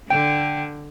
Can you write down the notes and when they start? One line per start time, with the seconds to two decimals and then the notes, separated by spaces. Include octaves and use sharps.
0.10 D3 G5